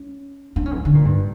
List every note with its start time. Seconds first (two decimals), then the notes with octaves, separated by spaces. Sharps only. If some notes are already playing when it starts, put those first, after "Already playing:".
Already playing: C#4
0.56 D4
0.66 C#4
0.76 E3
0.85 D3
0.95 A#2
1.05 G2